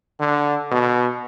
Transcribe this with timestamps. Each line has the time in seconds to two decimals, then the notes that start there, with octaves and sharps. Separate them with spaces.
0.20 D3
0.71 B2